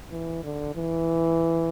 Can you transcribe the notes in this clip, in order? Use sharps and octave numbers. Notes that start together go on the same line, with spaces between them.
E3
D3
E3